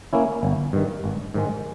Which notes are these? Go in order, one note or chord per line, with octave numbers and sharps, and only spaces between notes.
A#3 C#4 E4
G1
G2 D#3
G#1
G#2 D#3 G#3